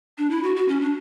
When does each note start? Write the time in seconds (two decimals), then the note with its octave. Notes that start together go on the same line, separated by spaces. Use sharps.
0.18 D4
0.31 E4
0.43 F#4
0.56 F#4
0.68 C#4
0.81 D4